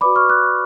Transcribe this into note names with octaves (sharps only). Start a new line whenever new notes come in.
F#4 B4 D5 B5 D6
C#6 F6
D6 F#6